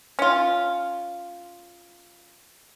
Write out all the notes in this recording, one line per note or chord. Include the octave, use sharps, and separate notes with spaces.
C#4 F4